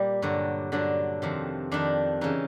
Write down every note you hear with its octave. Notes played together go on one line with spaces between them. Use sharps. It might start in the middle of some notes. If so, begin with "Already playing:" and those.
Already playing: A#2 G3
G2 D3 F#3
G2 D3 F#3 D4
F2 C3 D#3
F2 C3 D#3 D4
C#3 E3 D#4